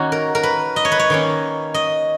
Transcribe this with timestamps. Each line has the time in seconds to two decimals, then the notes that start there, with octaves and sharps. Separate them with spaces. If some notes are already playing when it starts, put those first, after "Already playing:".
Already playing: D#3 A#3 C#4 F#4
0.12 A#4
0.35 A#4
0.43 B4
0.76 D#5
0.85 C#5
0.91 B4
0.99 C#5
1.10 D#3 A#3 C#4
1.74 D#5